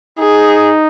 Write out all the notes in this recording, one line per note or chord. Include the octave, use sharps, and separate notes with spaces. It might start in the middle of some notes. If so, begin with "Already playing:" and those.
D#4 G#4